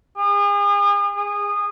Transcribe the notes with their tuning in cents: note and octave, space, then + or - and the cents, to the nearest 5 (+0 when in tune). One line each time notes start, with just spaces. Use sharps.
G#4 -40
G#4 -20